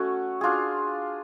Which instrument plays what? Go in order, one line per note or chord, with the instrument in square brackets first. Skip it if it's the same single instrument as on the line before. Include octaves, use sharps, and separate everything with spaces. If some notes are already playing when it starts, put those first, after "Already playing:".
Already playing: [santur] A3 C#4 F#4
D4 F4 G#4